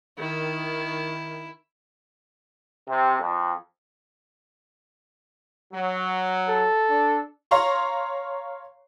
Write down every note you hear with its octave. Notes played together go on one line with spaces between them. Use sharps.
D#3 E4
C3
F2
F#3
A4
D4
C#5 F5 A#5 C6 C#6